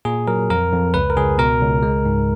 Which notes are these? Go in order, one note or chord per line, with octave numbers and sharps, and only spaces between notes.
A#2 G#4
F#3 A#4
F2 A#4
F2
C#2 B4
A#4
C#2 G#4
B2 A#4
C#2
G#3
G#2